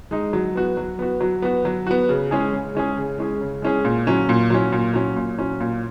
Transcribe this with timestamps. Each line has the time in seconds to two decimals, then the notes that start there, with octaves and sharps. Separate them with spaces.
0.11 G#3 D#4
0.33 F#3
0.55 B3 F#4
0.77 F#3
0.99 B3 F#4
1.21 F#3
1.42 B3 F#4
1.65 F#3
1.87 B3 F#4
2.09 C#3
2.31 G#3 C#4 G#4
2.53 C#3
2.75 G#3 C#4 G#4
2.97 C#3
3.18 G#3 C#4 G#4
3.41 C#3
3.62 G#3 C#4 G#4
3.85 A#2
4.07 F#3 C#4
4.29 A#2
4.50 F#3 C#4
4.72 A#2
4.94 F#3 C#4
5.16 A#2
5.38 F#3 C#4
5.60 A#2